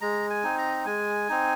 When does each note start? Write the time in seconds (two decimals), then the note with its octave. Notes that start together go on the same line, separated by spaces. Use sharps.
0.01 G#3 A#5
0.30 G#5
0.44 C4 D#4
0.58 A#5
0.86 G#3 G#5
1.29 C4 D#4